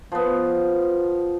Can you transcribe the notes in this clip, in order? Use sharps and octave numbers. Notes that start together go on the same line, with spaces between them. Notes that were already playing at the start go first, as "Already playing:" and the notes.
F3 B3